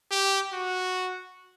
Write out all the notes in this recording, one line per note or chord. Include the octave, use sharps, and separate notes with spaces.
G4
F#4